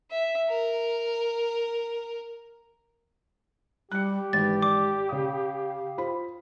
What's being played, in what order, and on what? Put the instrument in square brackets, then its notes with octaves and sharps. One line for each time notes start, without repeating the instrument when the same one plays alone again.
[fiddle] E5
A#4
[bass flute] G3 [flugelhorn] G4 [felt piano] F#6 C#7
[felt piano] G#1 [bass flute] E3 [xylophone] A6
[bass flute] D5 [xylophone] D6
[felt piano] C#3 D#6 [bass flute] F5
[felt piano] F4 C5 B5